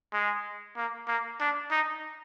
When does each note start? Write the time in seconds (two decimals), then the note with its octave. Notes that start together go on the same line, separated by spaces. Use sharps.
0.13 G#3
0.76 A#3
1.07 A#3
1.40 D4
1.71 D#4